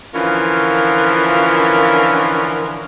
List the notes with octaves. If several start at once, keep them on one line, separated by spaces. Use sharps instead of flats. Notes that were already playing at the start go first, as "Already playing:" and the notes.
D3 E3 F3 C#4 F4 A#4